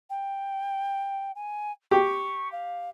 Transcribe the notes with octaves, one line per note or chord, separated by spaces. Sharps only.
G5
G#5
G4 C#6
F5